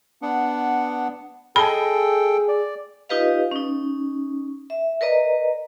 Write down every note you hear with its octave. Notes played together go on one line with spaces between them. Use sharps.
B3 D4 F#5
G#4 A4 D#5 G5 A5 B5
D5
D#4 F4 G4 B4 D#5 F5
C#4 D#4
E5
A#4 B4 D5 D#5 A#5